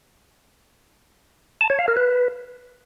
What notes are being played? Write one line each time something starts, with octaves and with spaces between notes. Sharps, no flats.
A5
C#5
F5
A#4
B4